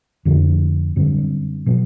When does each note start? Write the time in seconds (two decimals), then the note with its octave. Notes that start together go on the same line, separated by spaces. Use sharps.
0.25 F2 D3 F3 A3
0.96 F#2 D3 G3 C4
1.66 B2 F#3 B3